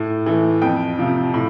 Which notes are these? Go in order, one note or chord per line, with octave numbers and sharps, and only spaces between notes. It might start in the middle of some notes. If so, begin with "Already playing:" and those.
Already playing: A2
E3 A3
F2 G5
C3 F3
A2